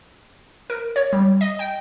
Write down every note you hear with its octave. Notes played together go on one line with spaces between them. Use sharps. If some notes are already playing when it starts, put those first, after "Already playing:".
A#4
C#5
G3
D#5
G5